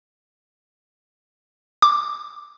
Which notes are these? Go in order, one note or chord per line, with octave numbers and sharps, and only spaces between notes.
D6